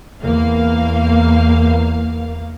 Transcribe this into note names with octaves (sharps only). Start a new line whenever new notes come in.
E2 A#3 F5